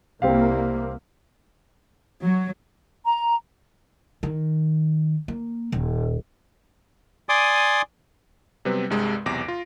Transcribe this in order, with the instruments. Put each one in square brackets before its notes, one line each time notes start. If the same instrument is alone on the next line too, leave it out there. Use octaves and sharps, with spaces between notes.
[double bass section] C2 A#3 [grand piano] C4 G4 F5
[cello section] F#3
[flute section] A#5
[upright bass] D#3
A#3
D#1
[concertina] D5 G#5 C6 D6 D#6
[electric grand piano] C3 F#3 G3 B3 C4 B4
C2 G2 C3 G#3
B1 E2 C3 D6 A#6 D7
F4